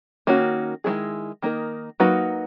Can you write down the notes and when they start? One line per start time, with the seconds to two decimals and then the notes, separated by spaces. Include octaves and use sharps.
0.27 D#3 A#3 C#4 F#4
0.84 D#3 G#3 B3 E4 G#4
1.42 D#3 A#3 D#4 A#4
2.00 F#3 A#3 D#4 F#4 B4